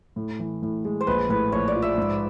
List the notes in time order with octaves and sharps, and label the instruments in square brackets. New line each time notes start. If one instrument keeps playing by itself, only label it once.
[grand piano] A2
E3
A2
G#3
[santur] C5
[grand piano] A#1 [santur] B4
[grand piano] A2 [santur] B4
[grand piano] A#1 [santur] C#5
[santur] D5
[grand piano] F3
[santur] E5
[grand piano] G#2